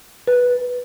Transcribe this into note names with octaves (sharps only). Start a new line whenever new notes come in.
B4